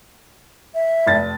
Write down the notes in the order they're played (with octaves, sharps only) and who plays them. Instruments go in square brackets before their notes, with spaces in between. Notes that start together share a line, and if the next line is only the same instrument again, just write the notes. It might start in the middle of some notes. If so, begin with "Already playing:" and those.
[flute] E5
[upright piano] F1 A6